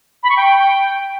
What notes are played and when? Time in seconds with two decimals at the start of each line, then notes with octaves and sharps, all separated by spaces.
0.23 B5
0.30 C#6
0.37 G5